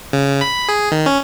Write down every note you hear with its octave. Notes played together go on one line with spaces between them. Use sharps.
C#3
B5
G#4
D#3
C#4